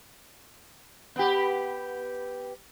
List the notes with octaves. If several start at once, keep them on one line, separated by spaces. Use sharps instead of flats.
B3 G4